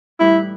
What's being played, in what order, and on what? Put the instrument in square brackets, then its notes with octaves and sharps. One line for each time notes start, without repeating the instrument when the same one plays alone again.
[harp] A2 E3 G3 D#4 [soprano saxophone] E4